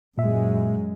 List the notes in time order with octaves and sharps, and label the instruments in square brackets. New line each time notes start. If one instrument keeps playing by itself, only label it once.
[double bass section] F#2 G#3 [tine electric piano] A#2 E5